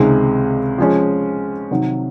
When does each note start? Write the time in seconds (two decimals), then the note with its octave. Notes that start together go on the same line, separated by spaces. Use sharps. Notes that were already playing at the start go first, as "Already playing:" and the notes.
Already playing: C#2 C3 D#3 G#3
0.78 F3 G#3 C#4
1.71 C3 D#3 F#3